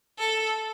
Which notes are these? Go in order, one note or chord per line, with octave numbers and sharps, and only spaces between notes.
A4